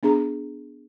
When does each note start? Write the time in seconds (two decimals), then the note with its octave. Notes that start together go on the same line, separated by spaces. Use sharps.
0.03 B3 D4 G#4 A#5